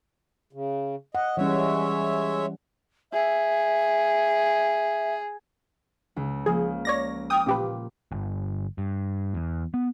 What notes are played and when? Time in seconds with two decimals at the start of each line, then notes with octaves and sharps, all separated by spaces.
0.53 C#3
1.15 D#5 F#5
1.37 E3 G3 G#3 C#4 C#5 E5
3.13 G#4 E5
6.16 C#2
6.46 F3 A#3 G#4
6.85 C#5 D5 A#6
7.30 G5 D6 D#6 F6
7.46 A1 A#2 G4 B4
8.12 G1
8.78 G2
9.34 E2
9.74 B3